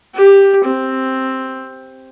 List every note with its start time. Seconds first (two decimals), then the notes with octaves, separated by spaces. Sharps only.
0.15 G4
0.65 C4